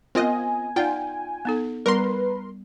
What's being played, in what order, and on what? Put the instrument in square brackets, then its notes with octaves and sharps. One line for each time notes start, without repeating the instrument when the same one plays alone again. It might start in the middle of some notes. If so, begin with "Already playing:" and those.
[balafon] B3 A#4 [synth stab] C4 F4 D#5 [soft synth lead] G#5
[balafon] D#4 D5 F#5 [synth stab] F4 G5
[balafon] B3 D#4 A4
[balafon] G3 B3 [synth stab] A#4 C6 [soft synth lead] B4